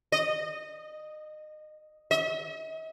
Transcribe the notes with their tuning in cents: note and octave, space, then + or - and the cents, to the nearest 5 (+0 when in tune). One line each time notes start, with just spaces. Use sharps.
D#5 -25
D#5 +45